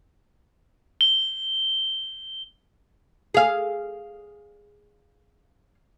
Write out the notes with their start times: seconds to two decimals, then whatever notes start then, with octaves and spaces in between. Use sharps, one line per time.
1.01 G7
3.34 G#4 F5